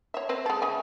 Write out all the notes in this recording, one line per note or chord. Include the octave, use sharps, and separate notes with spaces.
C#5 E5
C4 B4 C5
G#3 A4
C#3 E5 G#5